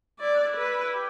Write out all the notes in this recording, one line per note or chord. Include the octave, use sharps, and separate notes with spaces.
E4 D5
D4
E4
B4
E4
G4